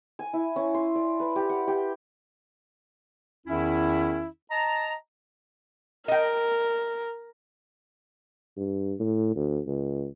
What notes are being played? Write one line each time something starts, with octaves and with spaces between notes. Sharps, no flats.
G#5
E4
C#4
C6
D5
B4
G4
F#5
G4
E2 D#3 C#4 E4
D#5 A5 A#5
A#4 D#5 G5
G2
A2
D2
C#2